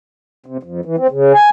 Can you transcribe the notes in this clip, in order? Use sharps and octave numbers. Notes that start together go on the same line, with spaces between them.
C3
F2
E3
C4
C#3
G#5